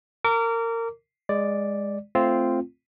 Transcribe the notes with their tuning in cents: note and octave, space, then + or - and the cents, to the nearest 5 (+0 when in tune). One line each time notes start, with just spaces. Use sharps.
A#4 -25 D6 -30
G#3 -15 D5 +0
A3 +0 C4 +0 F4 -10